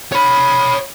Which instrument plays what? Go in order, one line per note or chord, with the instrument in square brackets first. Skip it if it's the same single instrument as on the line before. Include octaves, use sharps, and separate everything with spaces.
[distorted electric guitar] C#5 B5